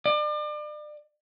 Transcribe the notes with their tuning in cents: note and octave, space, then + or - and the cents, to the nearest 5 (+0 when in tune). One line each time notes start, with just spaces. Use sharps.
D5 +35